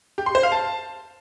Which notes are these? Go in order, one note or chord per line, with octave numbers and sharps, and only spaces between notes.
G4
C6
C5
F5
A5